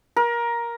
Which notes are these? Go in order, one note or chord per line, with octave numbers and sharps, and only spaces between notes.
A#4